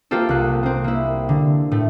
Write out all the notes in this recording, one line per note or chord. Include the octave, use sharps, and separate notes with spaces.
A#3 C4 F4 G4 A4
C2 F#6
A#3 C4
A#3 E4
D3
A2 A3